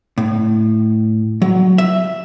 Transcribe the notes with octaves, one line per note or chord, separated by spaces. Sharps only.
A2
F#3
E5